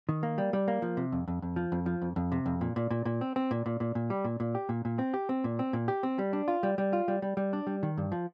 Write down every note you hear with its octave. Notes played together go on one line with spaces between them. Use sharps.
D#3
A#3
G3
G3
A#3
F3
C3
F2
F2
F2
F3
F2
F3
F2
F2
C3
F2
A#2
A#2
A#2
A#2
C4
C4
A#2
A#2
A#2
A#2
G3
A#2
A#2
G4
A#2
A#2
C4
G4
C4
A#2
C4
A#2
G4
C4
G3
D4
F4
G3
G3
F4
G3
G3
G3
D4
G3
D#3
G2
F3